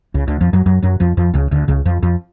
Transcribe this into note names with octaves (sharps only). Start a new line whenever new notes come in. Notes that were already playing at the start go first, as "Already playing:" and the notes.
C#2 C#3
D2 D3
F2 F3
F#2 F#3
F#2 F#3
F#2 F#3
F2 F3
F2 F3
C#2 C#3
D2 D3
C#2 C#3
F2 F3
F2 F3